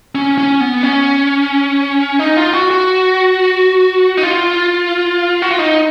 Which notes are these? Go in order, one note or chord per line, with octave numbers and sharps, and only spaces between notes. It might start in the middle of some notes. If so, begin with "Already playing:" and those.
C#4
C#4
B3
C#4
D#4
F4
F#4
F#4
D#4
F4
F#4
F4
D#4